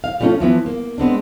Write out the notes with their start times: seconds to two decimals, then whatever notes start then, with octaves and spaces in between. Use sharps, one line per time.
0.04 F5
0.20 F3 G3 A3 A#3 C#4 F4
0.40 E3 F3 B3
0.66 A#3
0.98 G#3 B3 C4 D4